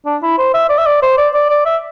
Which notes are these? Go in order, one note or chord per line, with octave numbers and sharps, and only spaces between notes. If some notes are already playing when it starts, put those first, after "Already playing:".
D4
E4
C5
E5
D5
E5
D5
C5
D5
D5
D5
E5